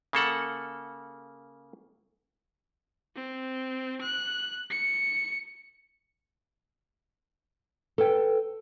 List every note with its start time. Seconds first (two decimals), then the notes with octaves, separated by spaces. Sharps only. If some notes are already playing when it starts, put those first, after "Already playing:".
0.13 C#3 A#3 A4 F#5
3.16 C4
4.01 F#6
4.71 C#7
7.98 A4 B4 G5